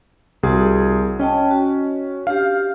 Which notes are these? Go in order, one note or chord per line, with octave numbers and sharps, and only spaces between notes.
C2 C4 F#4 G#4
C#4 D#5 G5 A5
F#4
D4 G4 F5